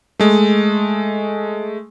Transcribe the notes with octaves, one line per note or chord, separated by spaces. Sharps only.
G#3 A3